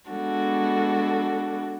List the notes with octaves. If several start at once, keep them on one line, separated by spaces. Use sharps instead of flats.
G#3 B3 D4 F#4 A4